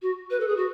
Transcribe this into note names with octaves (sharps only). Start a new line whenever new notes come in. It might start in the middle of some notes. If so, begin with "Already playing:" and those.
F#4
B4
A4
G#4
F#4